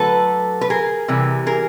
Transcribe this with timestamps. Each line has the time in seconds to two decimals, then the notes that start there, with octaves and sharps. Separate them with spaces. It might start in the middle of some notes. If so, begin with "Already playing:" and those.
Already playing: D3 F#3 A3 A4 B4
0.61 B4
0.70 G#4 A#4
1.08 C3 E3 G3
1.46 G#4 A#4